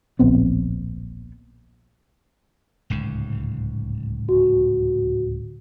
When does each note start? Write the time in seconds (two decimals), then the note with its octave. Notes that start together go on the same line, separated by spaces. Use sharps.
0.19 D1 A#1 B3 C4
2.90 D1 C#2 G#2
4.29 F#4